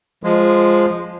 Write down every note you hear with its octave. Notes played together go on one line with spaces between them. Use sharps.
F3 G#3